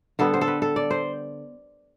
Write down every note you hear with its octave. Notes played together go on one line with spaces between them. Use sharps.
D3 G3 B3 A4
C5
A4
B4
A4
D5
C5